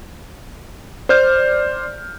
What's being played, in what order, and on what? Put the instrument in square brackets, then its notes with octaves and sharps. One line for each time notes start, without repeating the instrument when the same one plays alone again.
[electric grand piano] C5 D5 F6 G6